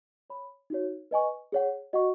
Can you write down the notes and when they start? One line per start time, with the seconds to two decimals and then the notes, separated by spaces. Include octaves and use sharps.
0.30 C#5 B5
0.70 D#4 F#4 C#5
1.11 B4 D#5 G#5 C#6
1.52 G#4 C#5 F#5
1.93 F#4 D#5 F#5 C#6